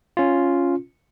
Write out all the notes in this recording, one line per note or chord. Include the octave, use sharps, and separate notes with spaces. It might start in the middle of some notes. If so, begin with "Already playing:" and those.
C#4 F4